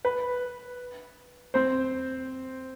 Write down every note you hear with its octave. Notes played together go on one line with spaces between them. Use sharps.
B4
C4 C5